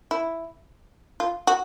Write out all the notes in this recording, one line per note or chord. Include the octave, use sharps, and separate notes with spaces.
E4
F4
F#4